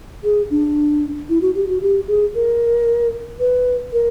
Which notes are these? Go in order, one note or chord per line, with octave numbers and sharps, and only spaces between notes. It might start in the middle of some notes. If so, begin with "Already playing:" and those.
G#4
D4
E4
F#4
G4
F#4
G4
G#4
A#4
B4
A#4